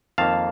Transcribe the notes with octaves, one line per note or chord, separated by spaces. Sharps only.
F2 D#3 A#3 F5 A5